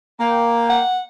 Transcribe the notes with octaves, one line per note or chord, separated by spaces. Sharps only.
A#3 G5
F#5